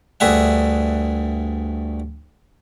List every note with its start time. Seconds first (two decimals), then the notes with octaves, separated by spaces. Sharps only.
0.20 D2 G2 G#4 E5 F#5